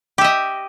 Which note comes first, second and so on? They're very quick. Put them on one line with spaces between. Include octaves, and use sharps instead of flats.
G4 E5 D#5